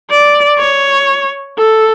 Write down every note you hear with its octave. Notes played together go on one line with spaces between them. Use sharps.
D5
C#5
A4